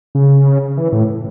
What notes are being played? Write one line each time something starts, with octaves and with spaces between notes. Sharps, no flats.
C#3
E3
A2